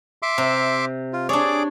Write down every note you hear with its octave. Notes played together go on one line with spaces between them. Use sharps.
E5 C6 D6
C3
F4
D4 G#4 C#5 D5 D6